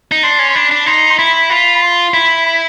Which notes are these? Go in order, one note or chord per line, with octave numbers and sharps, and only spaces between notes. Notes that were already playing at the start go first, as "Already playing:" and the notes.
D#4
D4 C6
C#4
C6
D4 B5
D4
D#4 C6
C6
E4 B5
F4 B5
B5
C6
E4 B5
B5